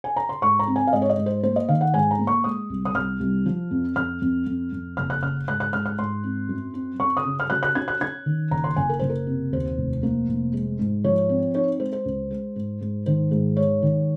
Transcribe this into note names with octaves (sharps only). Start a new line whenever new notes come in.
G#5
A#5
C6
G#2 C#6
A#5
C4
G#5
F5
G#2 D#5
C#5
D#5
G#2
C5
A#3 C5
D#5
D#3 F5
F#5
G#2 G#5
A#5
A#3
C#6
G#3 D#6
C2
D#6
C2 F6
C2
F3
F2
F2 F6
F2
F2
F2
F#1 F6
F#6
C#3 F6
G#2 F#6
F#6
G#2 F6
F6
G#2 C6
C4
F#2
C4
F#2 C#6
D#6
C#3
F6
F#3 F#6
F#6
C#4 G#6
F#6
C#4 G#6
D#3
F#1 A#5
C6
F#1 G#5
A#4
F#1 C5
A#4
C3
D#2 C5
F1
A#3
F1
G#3
G#2
F3 C#5
C4
D#4 C#5
G#3 C5
C5
C#2
G#3
G#2
G#2
D#3 C5
G#2
G#3 C#5
D#3